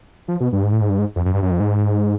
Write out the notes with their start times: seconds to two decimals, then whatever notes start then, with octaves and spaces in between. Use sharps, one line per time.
0.28 F3
0.40 B2
0.52 G2
0.64 G#2
0.72 A2
0.81 G#2
0.90 G2
0.99 G#2
1.16 F2
1.25 F#2
1.34 G2
1.42 F#2
1.51 F2
1.60 G#2